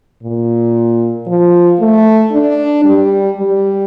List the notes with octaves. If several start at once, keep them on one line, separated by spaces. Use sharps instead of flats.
A#2
F3
A3
D4
G3
G3